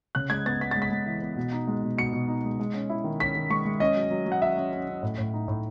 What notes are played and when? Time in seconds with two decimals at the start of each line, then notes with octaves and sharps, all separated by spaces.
0.15 C#3 F#6
0.30 G#3 G#6
0.46 B3 A6
0.61 B3 B6
0.71 G#3 A6
0.82 B6
0.91 G#3
1.07 E3
1.22 B3
1.36 B2
1.52 D#4
1.67 G#3
1.83 B2
1.97 B2 C#7
2.13 B2
2.28 D#4
2.44 G#3
2.59 G#3
2.74 C#4
2.90 E4
3.04 D#3
3.20 C#4 B6
3.36 D#3
3.50 G#3 C#6
3.65 G#3
3.80 C#4 D#5
3.95 F#3
4.11 F#3
4.26 F#3
4.32 F#5
4.42 C#4 E5
4.57 C#4
4.72 C#4
4.88 C#4
5.03 A2
5.18 A2
5.34 D#4
5.48 A2